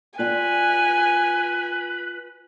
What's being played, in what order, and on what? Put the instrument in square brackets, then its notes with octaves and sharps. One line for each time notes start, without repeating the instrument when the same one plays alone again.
[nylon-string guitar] F4 D5 G5 [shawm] B4 [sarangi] G#5